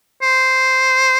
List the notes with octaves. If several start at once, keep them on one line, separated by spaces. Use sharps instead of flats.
C5